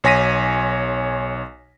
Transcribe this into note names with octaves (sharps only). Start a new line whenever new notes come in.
B1 C#5 G#5 A#6 B6 D#7